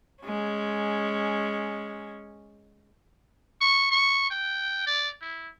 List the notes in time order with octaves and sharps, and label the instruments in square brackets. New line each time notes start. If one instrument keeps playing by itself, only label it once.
[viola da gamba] G#3 C#4
[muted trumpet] C#6
C#6
G5
D5
E4